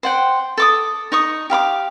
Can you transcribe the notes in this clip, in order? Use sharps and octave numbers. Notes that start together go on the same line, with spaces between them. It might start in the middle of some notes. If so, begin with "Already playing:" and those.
C5 F#5 G5
A4 D6 D#6
D#4 C#6 D#6
G4 F5 B5 D6